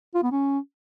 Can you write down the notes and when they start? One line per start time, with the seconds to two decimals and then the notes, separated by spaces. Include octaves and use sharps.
0.15 F4
0.23 B3
0.32 C#4